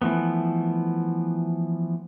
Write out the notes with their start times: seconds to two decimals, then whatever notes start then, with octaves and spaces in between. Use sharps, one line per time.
0.02 E3 F3 A3 B3